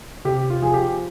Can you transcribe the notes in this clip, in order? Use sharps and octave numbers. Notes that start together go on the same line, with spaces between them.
C3 G4
F4
F3 G#4
G4